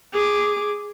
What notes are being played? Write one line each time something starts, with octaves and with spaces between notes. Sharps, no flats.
G#4 D6